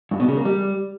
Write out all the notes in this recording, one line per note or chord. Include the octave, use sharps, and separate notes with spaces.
G2
B2
C#3
A#3
G3